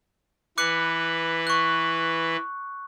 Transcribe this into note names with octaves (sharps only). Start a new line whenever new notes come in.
E3 B4 D6 F#6 C#7
C#6 F#6